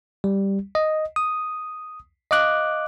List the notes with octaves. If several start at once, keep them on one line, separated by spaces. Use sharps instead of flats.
G3
D#5
D#6
D#5 F5 D6 F#6